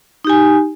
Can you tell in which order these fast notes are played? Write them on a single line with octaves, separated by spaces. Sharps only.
D#4 G4 G#5